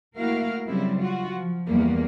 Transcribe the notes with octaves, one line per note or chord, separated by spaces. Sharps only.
A3 A#3 E4 F#4 A#4 F5
C#3 F#3 G3 C4 E4
F4 F#4
F3
E2 G3 A#3 B3